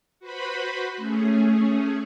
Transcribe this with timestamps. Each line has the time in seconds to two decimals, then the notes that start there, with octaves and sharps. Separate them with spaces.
0.19 F#4 B4 C5 B5
0.97 A3 C#4 G#4